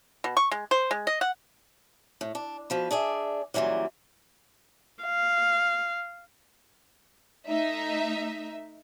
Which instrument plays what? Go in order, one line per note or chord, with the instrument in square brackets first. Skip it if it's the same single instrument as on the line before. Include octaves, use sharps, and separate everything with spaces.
[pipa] B2
C#6
G#3
C5
G#3
D#5
F#5
[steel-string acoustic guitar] A2
D4
B2 F3 B4
D4 G#4 D5 E5
A#2 C#3 E3 F#3 G3
[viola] F5
[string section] A3 D#4 E5